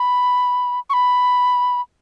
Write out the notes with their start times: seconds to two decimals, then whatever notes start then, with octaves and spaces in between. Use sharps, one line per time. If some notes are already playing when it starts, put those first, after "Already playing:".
Already playing: B5
0.89 C#6
0.93 B5